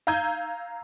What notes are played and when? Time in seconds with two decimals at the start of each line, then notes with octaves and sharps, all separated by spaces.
0.07 F5 A#5 E6 G6 G#6 D#7